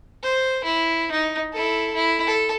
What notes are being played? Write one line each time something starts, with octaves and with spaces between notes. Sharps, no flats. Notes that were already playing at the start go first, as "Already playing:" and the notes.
C5
E4
D#4
E4 A4
E4
A4